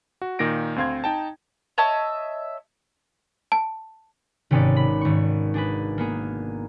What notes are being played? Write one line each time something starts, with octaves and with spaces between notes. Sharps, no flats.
F#4
A#2 D#3 A#3 A#6 D7
D2 C4 F5 C6 G#6
D#4 G5 A5
C#5 D#5 E5 A5
A5
G#1 C3 C#4 D#4 B4 D5
B5
G#1 C#6
D4 G#4 B4
A#3 B3 G#4